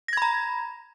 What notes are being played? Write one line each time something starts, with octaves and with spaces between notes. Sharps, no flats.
A#5 B5 G#6 A#6